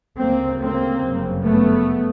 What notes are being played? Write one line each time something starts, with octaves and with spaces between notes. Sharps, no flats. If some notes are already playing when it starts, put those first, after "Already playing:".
D2 C#3 A#3 C4
A#3 C4
G1 F#2 C#3
A3 B3